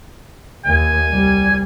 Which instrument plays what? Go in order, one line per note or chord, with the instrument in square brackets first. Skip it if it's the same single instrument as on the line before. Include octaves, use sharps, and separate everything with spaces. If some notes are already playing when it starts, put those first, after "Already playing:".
[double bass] D#2 [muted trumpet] G#5
[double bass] C2 G3